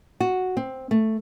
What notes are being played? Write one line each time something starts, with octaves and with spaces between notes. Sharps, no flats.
F#4
C4
A3